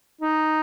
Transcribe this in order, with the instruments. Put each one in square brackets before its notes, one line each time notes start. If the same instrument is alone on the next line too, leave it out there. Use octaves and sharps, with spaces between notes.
[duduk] D#4